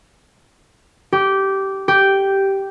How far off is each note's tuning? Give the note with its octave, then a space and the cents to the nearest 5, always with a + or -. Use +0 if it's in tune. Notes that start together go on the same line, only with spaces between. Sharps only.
G4 -15
G4 -5